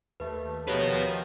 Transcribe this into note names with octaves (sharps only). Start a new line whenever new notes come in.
D#2 A3 B4
D#3 F3 F#4 G4 B4 C#5